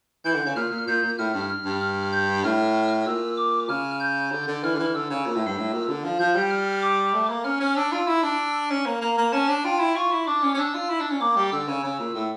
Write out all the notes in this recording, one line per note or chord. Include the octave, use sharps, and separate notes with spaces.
E3 G6
D3
C#3
A#2 F6
A#2
A#2 G6
A#2
A2 F6
G2
F6
G2
F6
G6
A2 F6
A#2 E6
D6
C#3 F6
G6
D3
D3
E3 F6
D3
E3
D3 E6
C#3
A#2
A2
G2
A2
A#2
D3
F3
F3 G6
G3
F6
D6
A3
A#3
C#4 F6
C#4
D4 E6
F4
E4 E6
D4
C#4
A#3
A#3 A#5
A#3
C#4 A5
D4
F4 G5
E4
F4 C#6
E4
D4 D6
C#4
C#4
D4 E6
F4
E4
D4
C#4
A#3 D6
G3
D3 E6
C#3
C#3
A#2
A2